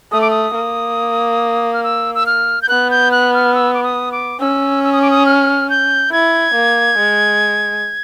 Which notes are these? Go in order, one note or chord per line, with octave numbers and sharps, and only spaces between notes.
A3 D#6
D6
D#6
A#3
F6
E6
E6
F6
G6
B3 F#6
G6
F#6
F6
E6
D6
D#6
D6
C#4 E6
E6
D#6
D6
D#6
F6
G6
E4 G#6
A#3
G#3